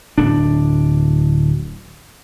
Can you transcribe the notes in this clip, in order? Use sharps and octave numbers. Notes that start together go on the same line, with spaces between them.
D1 D4